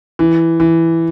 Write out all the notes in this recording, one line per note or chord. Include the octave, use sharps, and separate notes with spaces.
E3
E3